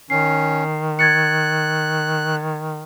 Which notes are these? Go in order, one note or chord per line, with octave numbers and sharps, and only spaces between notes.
D#3 C#4 C7
F#6 G#6 A6 C#7